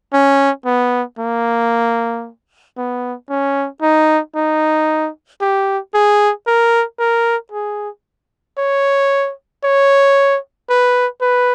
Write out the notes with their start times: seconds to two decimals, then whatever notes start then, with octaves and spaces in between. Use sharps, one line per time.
0.13 C#4
0.66 B3
1.19 A#3
2.78 B3
3.30 C#4
3.82 D#4
4.36 D#4
5.41 G4
5.94 G#4
6.47 A#4
6.99 A#4
7.52 G#4
8.58 C#5
9.64 C#5
10.70 B4
11.22 B4